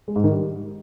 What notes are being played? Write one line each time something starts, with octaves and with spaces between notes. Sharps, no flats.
G#3
G#2
D#3
G3